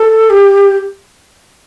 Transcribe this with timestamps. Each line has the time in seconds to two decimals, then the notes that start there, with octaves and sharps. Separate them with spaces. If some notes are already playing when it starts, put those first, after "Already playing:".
Already playing: A4
0.30 G4